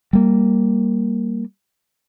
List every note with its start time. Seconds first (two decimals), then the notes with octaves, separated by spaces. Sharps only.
0.13 G3 A#3